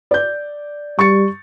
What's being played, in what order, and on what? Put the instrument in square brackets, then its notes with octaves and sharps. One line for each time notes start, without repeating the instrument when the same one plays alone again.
[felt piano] D5 G6
[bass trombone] G3 [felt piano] C#6 A6 C#7